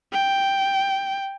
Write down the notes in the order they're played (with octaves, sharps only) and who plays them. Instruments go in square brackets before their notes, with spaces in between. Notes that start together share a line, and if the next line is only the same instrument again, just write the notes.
[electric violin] G5